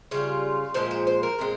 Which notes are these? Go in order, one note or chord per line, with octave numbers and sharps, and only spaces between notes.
C#3 G3 F4
A#2 F3 G#3 C5
C5
C5
A#4
A#2 G#3 C4